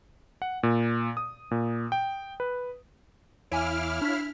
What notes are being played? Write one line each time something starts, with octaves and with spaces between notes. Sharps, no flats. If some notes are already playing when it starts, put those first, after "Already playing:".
F#5
A#2
D#6
A#2
G5
B4
E2 E4 C#5 F5 G#5 D6 F6
D4 C#5 F5 B6